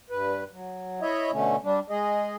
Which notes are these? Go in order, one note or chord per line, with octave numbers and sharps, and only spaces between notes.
G2 B4
F#3
E4 C#5 D#5 E5
B2 D3 A3 C#4
G3 D4
G#3 G#4 D#5